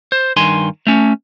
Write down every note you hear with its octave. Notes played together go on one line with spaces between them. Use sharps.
C5
G2 D#3 G#5 C6
A3 C#4